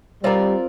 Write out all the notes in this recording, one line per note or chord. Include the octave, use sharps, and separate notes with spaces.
G3 C4 F4 A#4 D5